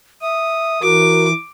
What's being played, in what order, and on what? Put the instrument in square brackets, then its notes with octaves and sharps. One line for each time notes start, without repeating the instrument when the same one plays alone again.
[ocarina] E5 [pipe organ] D#6
[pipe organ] E3 [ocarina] F#4 [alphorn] A#4 [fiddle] D6